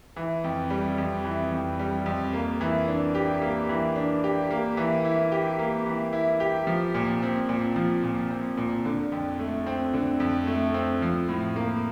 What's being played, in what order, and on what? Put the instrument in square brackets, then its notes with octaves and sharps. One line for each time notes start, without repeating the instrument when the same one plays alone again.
[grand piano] E3
F2
G3
F2
E3
F2
G3
F2
A#3
E3
D4
G4
A#3
E3
D4
G4
A#3
E3
E4
G4
A#3
E3
E4
G4
F3
A#2
C4
A#2
F3
A#2
C4
A#2
D3
F2
A3
C4
D3
F2
A3
C4
F3
A2
A#3